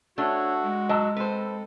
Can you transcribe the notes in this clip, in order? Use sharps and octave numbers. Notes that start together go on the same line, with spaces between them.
A3 D4 F#4 C#5
G#3
F#3 D#5 A5 E6
C4 A4 B4 C5